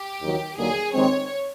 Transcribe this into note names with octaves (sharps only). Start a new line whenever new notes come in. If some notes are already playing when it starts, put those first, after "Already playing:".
Already playing: G4
D#2 D#3 F#3
D#2 D3 F#3 A#3 G#4
D#2 D#3 G#3 C4 C#5